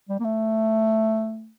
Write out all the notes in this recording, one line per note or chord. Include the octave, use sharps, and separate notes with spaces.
G3
A#3
A3